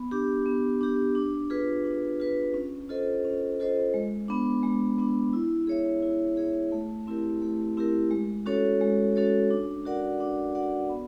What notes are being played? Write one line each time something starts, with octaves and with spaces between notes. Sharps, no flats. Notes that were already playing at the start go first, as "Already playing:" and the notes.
Already playing: B3
D4 G4
B3
D4 G4
D4
F4 G#4 B4
D4
F4 G#4 B4
C#4
F4 A4 C5 D#5
C#4
F4 A4 C5 D#5
G#3
B3 D4
G#3
B3 D4
E4
G#4 C#5 E5
E4
G#4 C#5 E5
A3
C4 E4 G4 A#4
A3
C4 E4 G4 A#4
G#3
C#4 F#4 A4 C#5
G#3
C#4 F#4 A4 C#5
D4
F#4 A#4 D5 F#5
D4
F#4 A#4 D5 F#5
B3